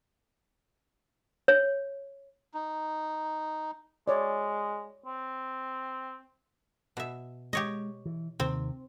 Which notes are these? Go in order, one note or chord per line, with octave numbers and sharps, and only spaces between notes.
C#5
D#4
G#3 C#5 D5
C4
B2 E5
G#3 G4 C#5 D#5
E3
D#2 C3 D#3 C4